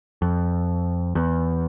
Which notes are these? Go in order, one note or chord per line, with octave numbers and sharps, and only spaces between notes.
F2
E2